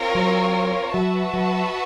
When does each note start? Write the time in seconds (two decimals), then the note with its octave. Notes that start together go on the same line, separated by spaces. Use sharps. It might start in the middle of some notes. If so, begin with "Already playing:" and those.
Already playing: C4 F4 A#4 C#5
0.15 F#3
0.94 F#3 F#4 B4 E5 A5
1.33 F#3